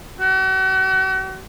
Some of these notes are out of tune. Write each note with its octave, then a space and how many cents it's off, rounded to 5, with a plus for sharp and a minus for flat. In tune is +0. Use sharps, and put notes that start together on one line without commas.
F#4 +40